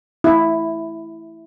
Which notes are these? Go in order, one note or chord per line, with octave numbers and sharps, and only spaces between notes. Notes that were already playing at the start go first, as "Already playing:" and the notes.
E4